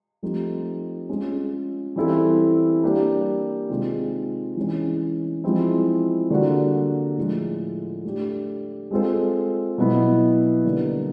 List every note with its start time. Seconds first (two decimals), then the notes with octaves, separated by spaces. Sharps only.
0.23 F3 A3 C4 D#4 G4
1.09 G#3 C#4 F4 G#4
1.96 E3 G3 C4 E4 A4
2.83 G3 A#3 D4 G4 A#4
3.70 C3 D#3 G#3 C4 F4
4.56 E3 G#3 C#4
5.44 F3 G#3 C4 E4
6.30 D3 G3 A#3 D4 F#4
7.17 A2 F3 G#3
8.05 A3 D4 G4
8.91 G#3 C4 F4 A4 C5
9.78 B2 F#3 B3 E4
10.65 D3 G3 A#3 D#4